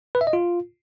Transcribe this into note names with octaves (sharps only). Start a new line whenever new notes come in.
B4
E5
D#5
F4